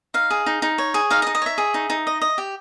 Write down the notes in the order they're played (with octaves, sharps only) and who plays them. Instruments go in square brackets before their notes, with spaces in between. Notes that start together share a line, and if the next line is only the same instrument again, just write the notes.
[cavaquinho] D#4 F5
G#4
D#4
D#4
C#5
G#4
D#4 F5
D#5
D#4
D#5
C#5 E5
G#4
D#4
D#4
D#5
D#5
G4